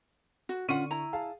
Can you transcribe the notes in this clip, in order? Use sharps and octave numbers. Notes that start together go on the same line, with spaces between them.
F#4
D3 C#4 F4 F#5 C#6 D#7
E4 A#5
G#4 F5 A5